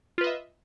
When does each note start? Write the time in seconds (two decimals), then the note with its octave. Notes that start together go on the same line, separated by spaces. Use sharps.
0.18 F4
0.21 B4
0.24 D#5
0.27 E5